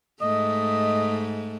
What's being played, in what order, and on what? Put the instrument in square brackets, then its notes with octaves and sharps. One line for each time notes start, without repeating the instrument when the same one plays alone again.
[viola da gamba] G#2 A3 [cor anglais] D#5